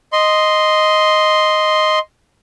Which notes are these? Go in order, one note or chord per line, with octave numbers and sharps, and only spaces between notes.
D#5 C6